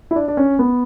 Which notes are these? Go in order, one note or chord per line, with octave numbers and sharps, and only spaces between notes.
E4
D4
D4
C#4
B3